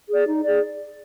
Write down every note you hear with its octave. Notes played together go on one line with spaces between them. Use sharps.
G#4 D5
D#4
G#4 D5